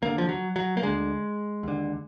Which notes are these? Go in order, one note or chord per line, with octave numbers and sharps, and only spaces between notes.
D#2 D3 A#3
F3
F#3
F#3
A#3
D2 D3 G#3
D#2 D3